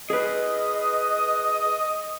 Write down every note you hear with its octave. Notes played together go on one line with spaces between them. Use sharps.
G#4 B4 D#5